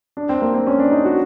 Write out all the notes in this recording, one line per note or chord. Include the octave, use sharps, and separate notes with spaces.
D4
C4
A#3
C4
C#4
D4
D#4
F#4